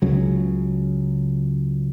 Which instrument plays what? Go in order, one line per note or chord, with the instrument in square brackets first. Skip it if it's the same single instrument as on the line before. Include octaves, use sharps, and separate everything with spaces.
[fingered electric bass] C#2 C#3 F#3